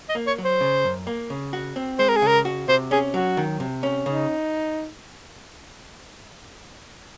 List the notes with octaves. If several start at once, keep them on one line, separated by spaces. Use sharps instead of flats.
D#5
A#3
C#5
F#3
C5
C#3
F#2
A#3
C#3
F#4
C4
G#3 C5
A#4
G#4
C#3 A#4
F#4
C3 C5
C#4 G#4
F#3 F#4
D#3
C3
C#4
C#3 D#4